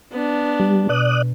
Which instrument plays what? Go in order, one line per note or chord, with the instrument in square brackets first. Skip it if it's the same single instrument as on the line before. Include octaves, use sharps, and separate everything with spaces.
[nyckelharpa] B3 D4
[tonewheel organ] G3
[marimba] B2 [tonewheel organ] D5 D#6 F#6